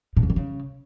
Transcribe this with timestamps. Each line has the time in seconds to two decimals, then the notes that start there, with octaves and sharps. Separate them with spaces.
0.17 A#2
0.23 F2
0.30 D3
0.36 C#3